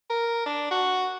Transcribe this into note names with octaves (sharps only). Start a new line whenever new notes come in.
A#4
D4
F#4